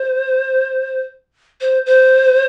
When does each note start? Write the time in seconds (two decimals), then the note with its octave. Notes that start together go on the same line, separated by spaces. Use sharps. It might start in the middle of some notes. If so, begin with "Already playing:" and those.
Already playing: C5
1.61 C5
1.86 C5